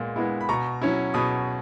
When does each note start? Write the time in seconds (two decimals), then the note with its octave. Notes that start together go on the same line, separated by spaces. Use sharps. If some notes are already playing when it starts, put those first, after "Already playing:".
Already playing: A#2 G#3 B3
0.16 G#3 B3 E4
0.41 B5
0.49 B2 A#5 C#6
0.82 F#3 C#4 E4
1.14 B2 B5 D#6